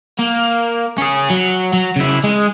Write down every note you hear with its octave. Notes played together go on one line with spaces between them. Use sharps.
A#3
C#4 G#4
F#3
F#3
C#3 E4
G#3